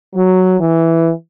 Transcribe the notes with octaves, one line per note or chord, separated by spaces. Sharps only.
F#3
E3